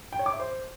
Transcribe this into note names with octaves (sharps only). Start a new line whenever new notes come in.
G5
C#5
D6
E5
C5